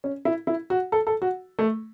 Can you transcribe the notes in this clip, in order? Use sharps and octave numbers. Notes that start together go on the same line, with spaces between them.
C#4
E4
E4
F#4
A4
A4
F#4
A3